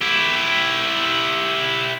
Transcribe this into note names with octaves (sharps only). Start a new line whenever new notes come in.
E4 G4